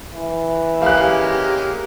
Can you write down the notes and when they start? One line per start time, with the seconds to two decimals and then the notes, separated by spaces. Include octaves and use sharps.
0.14 E3
0.82 G#3 A#3 C#4 G4 F5 F#6